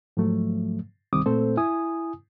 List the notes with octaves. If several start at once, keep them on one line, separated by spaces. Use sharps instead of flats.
G#2 F3 F#3 A3
C2 D#3 G3 C4 D6 D#6
A#2 A3 C4 A4 C5
E4 G#5 D#6